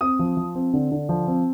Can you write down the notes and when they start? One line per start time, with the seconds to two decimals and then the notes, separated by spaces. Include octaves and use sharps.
0.01 C4 D#6
0.19 F3
0.37 F3
0.55 C4
0.73 D3
0.92 D3
1.09 F3
1.27 C4